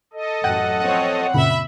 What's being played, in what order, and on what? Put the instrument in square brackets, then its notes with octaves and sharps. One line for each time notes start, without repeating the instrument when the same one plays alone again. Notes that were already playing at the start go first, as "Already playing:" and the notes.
[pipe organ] A4 D#5
[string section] A1 F#2 [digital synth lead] F#5 [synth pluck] G5
[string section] F3 C4 C#5 [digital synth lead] F#5
[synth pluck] F#2 A#2 C#3 [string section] E5 B5